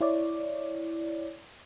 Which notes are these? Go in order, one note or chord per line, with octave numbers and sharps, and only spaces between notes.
E4 C#5 D5